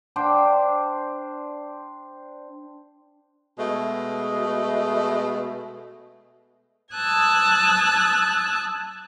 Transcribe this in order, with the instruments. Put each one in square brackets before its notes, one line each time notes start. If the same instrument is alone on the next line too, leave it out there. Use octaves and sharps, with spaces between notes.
[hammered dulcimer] D4 C5 G5
[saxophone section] B2 G#3 A3
[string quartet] A5 D#6 E6 F#6 G#6